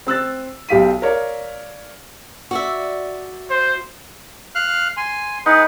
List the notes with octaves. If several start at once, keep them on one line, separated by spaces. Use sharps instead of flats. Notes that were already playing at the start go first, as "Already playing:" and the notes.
C4 E6 F#6 A6
B1 G4 F5 B6 D#7
A#4 C#5 D5 F5
F#4 D5 E5
C5
F5 F6 F#6
G#5 C6
D#4 G#4 B4 F#5